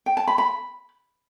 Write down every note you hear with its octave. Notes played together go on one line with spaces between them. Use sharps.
G5
A5
B5
B5